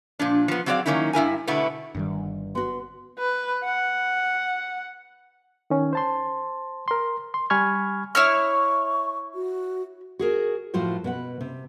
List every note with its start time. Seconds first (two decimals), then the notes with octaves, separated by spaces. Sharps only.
0.19 A#2 F3 D4
0.48 F3 B3
0.66 F#3 C4 F#4 G#4 D5 F5
0.86 D#3 F#3 A#3 C#4 D#4 E4
1.13 G2 E4 A#4 G#5
1.47 B2 D3 A3 B3 E4
1.95 G1 G2 D#3 G3
2.55 B3 F#4 C6
3.18 B4
3.65 F#5
5.70 D#3 C#4
5.93 C5 A5 C6
6.88 A#4 C6
7.34 C6
7.50 G3 G#5 B5 C#6 F6 G#6
8.15 E4 C#5 C#6 F6
9.35 F#4
10.19 F#4 G#4 A#4
10.74 A2 F3 F4 F#4 C5
11.04 B2 B4 F#5
11.41 C3